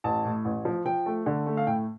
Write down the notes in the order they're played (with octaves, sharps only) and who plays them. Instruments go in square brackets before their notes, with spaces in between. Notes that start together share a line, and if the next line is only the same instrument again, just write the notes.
[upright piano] A1 A5
A2
A1
F3
F3 G5
A3
D3
A3
F5
A2 G5